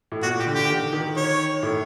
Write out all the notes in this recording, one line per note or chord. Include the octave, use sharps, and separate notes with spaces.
A2
A#2 F#4
G4
D3
G4
D#3
D#3
C#5
A2